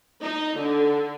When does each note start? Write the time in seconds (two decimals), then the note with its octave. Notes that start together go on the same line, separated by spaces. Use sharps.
0.22 D#4
0.58 D3